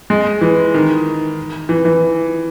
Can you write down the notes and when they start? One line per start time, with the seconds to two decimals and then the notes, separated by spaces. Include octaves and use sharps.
0.10 G#3
0.41 E3
0.74 D#3
1.69 E3
1.85 E3